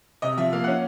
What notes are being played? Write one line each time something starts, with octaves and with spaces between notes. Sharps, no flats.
C3 D#5
F3 E5
A#3 F5
C#4 F#5